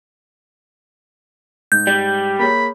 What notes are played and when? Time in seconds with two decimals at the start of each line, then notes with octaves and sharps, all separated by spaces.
1.72 G#2 G6
1.87 G3
2.39 A#3 G#4 C#5 B5